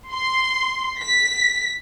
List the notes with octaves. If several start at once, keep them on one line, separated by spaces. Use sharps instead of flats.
C6
B6